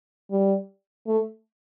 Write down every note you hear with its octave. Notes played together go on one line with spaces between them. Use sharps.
G3
A3